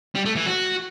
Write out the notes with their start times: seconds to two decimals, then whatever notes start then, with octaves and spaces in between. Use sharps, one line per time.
0.15 G3
0.25 A3
0.36 E3
0.46 F#4